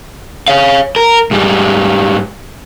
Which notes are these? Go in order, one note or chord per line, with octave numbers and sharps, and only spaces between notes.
C#5 F5
A#4
G#2 G3